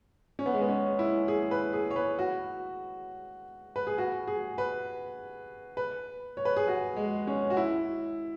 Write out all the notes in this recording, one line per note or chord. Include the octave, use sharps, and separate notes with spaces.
C#4
B3
G#3
B3
C#4
E4
G#4
B4
G#4
C#5
B4
F#4
B4
G#4
F#4
G#4
B4
B4
C#5
B4
G#4
F#4
G#3
C#4
F#4
E4